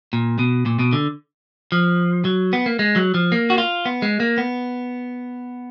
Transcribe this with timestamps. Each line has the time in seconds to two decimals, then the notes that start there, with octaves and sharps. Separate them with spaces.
0.13 A#2
0.39 B2
0.66 A#2
0.79 B2
0.93 D3
1.72 F3
2.25 F#3
2.53 B3
2.66 A#3
2.79 G#3
2.96 F#3
3.14 F3
3.32 A#3
3.50 F#4
3.58 F4
3.86 B3
4.02 G#3
4.20 A#3
4.38 B3